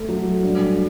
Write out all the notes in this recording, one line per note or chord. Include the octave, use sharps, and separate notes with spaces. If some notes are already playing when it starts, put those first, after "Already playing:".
Already playing: A3
F#3
G2